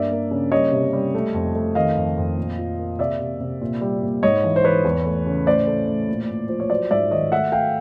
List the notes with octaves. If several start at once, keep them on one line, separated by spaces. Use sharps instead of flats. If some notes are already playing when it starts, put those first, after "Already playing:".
Already playing: G2 A#3 D5 E5
A#3
C#3
G3 C#5 D#5
C3
G3
A3
F2
A3
D#3 D#5 F5
F2
F2
A#2
F3
A#3
C3 D5 E5
C3
C3
A#2
G3
A#2
G#2 C#5 D#5
E3
C5
E3 B4 C#5
E2
A3
C#3
A2 C5 D5
A3
A2
A#2
A#2
F3 C5
C#5
F#3 C5 D5
G#2 D5 E5
D#3 C#5 D#5
A3 E5 F#5
A3 F5 G5